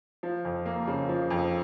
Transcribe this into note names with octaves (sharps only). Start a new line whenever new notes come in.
F3
F2
A#3
C#3
F3
F2